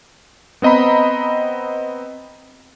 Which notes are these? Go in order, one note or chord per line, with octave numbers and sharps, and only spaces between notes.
B3 C4 D#5 A#5 B5